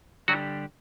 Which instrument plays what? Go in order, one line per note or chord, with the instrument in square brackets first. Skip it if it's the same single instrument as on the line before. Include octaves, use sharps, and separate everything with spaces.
[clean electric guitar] D3 G3 D4 G4 [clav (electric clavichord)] F#3 F#4